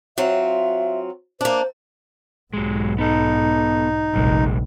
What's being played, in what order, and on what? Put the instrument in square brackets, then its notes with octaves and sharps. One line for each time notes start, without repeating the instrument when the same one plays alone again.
[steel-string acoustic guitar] F#3 C4 F4 [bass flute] E5
[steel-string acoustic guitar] A#3 D4 [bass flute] C5
[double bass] B1 G#2 [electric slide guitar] F#3 G#3
[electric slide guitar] B3 A4 [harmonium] D#4
[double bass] F1 A#1 [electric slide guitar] C3 G3 G#3